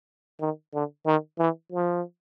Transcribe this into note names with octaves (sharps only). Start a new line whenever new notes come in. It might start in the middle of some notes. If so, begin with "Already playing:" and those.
D#3
D3
D#3
E3
F3